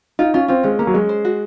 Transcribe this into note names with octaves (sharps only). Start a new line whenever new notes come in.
D#4 F4
C#4 F4
C4 F4
G#3 C#4
A#3 C#4
F#3
G#3 C#4
C5
F#4